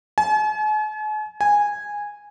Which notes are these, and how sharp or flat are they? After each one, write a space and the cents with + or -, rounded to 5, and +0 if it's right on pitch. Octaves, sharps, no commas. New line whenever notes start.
G#5 +45
G#5 -10